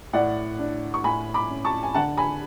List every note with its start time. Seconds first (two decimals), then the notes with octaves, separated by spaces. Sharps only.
0.13 A2 D5 F#5
0.59 D4
0.94 C#6
1.04 A2 G#5 B5
1.34 B5 D6
1.49 C#4
1.65 A5 C#6
1.83 G#5
1.94 D3 F#5 A5
2.17 G#5 B5